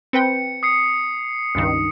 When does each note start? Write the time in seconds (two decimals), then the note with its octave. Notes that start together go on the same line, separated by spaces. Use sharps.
0.13 C4 B4 G5 C#7
0.63 D#6 C7 C#7
1.55 C#2 G2 D#3